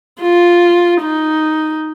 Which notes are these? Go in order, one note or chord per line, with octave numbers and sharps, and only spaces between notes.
F4
D#4